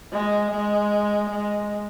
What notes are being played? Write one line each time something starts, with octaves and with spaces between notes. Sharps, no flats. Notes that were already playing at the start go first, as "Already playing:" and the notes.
G#3
G#3
G#3